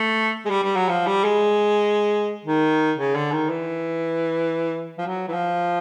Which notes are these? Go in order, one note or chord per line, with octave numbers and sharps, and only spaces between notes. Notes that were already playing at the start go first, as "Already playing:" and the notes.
Already playing: A3
G#3
G3
G3
F#3
F3
G3
G#3
D#3
C#3
D3
D#3
E3
F3
F#3
E3
F3